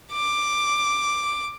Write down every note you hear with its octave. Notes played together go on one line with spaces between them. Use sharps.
D6